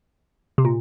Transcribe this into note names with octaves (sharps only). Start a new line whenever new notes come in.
C3
A#2